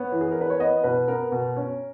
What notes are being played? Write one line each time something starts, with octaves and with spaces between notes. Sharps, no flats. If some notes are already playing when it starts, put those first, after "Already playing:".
Already playing: B3 C#5
E3
G#4
A#4
E3 B4
C#5
B3 D#5
B2 B4
B3 A#4
B2
C#4